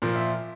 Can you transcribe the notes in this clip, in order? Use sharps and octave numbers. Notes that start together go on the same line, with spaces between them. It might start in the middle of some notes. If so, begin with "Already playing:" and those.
A#2 F3 A#4
E5